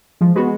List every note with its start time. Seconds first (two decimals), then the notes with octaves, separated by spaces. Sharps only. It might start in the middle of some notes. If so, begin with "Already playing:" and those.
0.21 F3 G#3
0.35 G#3 B3 F#4 B4